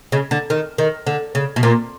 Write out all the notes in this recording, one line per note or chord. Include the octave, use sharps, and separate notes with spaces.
C#3
D3
D#3
D#3
D3
C#3
B2
A#2